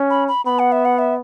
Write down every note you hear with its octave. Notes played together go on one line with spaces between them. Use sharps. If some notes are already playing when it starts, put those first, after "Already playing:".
Already playing: C#4
B5
B5
B3 B5
F#5
E5
F#5
E5